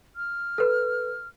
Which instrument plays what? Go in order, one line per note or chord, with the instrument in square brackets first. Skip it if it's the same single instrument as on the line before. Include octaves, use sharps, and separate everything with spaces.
[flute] F6
[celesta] A4 B4